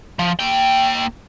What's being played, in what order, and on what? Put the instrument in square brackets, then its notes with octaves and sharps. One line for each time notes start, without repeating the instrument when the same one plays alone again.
[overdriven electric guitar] F3
A#3 G5